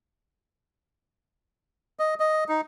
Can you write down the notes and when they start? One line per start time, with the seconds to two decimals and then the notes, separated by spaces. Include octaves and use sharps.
1.99 D#5
2.20 D#5
2.49 D#4